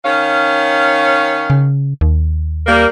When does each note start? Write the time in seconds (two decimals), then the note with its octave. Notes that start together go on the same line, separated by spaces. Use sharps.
0.04 D#3 C#4 F5
1.50 C#3
2.01 D#2
2.67 G3 A#3